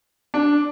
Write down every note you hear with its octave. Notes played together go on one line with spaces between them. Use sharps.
D4